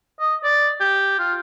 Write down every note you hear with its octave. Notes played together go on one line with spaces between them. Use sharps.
D#5
D5
G4
F4